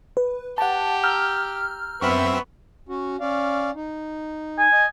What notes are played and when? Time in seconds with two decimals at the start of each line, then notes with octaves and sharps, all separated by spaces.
0.17 B4
0.58 G4 F#5 A5
1.04 A#5 E6 F6 G6
2.01 F#2 B3 C4 E5 B5 C#6
2.89 C#4 F#4
3.20 C#4 D5 F5
3.75 D#4
4.59 G#5
4.73 D#5